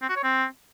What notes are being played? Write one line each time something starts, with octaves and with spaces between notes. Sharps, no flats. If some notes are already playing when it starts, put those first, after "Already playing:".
C4
F#4
C#5
C4